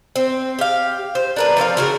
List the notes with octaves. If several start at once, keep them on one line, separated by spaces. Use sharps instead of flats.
C4
G4 F5
C5
D4 A#4 B4
F3 C4 C#5 F5
C#3 F#4 A#4